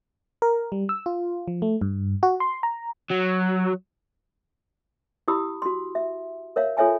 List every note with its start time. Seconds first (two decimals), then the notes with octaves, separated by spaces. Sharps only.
0.42 A#4
0.72 G3
0.89 E6
1.06 F4
1.48 F3
1.62 A3
1.81 G2
2.23 F#4
2.40 C6
2.63 A#5
3.11 F#3
5.28 E4 G4 B5 D#6 E6
5.62 F#4 C6
5.95 E5
6.56 A#4 C#5 E5 F5
6.77 F4 A4 C#5 E5 G#5 A5